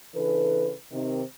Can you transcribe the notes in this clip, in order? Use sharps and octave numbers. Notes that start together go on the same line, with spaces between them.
C#3 E3 D4 A4 B4
C3 D#3 C4